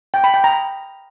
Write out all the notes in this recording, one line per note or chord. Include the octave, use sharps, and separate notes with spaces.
G5
B5
G5
A#5